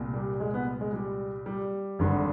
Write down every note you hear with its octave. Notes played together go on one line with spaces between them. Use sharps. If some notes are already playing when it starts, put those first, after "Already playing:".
Already playing: C2 A#2
G3
G#3
B3
G#3
G3
G3
G#1 G2 D3